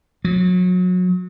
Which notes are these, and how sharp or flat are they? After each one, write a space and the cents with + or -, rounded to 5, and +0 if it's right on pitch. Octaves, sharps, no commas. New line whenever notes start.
F#3 -30